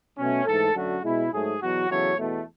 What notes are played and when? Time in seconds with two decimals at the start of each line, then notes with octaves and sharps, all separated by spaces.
0.17 B2 F#3 A3 C#4
0.45 G#2 E3 A3 A4
0.74 F#2 D3 F#3 A3 F#4
1.03 B2 G#3 E4
1.32 G#2 F#3 A3 G#4
1.61 E2 B2 F#3 F#4
1.89 E2 C#3 F#3 A3 C#5
2.17 E2 B2 A3